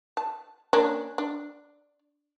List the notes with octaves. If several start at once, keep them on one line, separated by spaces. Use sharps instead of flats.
A5
A#3 C#4 D4
D4